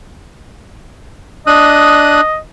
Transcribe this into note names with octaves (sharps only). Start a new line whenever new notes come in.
D4 D#5 D#6 F#6